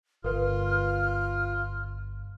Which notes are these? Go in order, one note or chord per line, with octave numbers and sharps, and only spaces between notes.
G1 F4 A#4 B4 F6